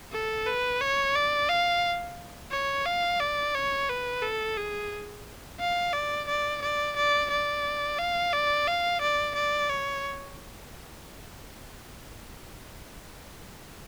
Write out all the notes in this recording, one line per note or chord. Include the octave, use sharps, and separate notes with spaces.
A4
B4
C#5
D5
F5
C#5
F5
D5
C#5
B4
A4
G#4
F5
D5
D5
D5
D5
D5
F5
D5
F5
D5
D5
C#5